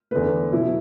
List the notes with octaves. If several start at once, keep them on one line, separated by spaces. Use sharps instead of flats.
E2 D3 A3 B4
B2 F#3 B3 E4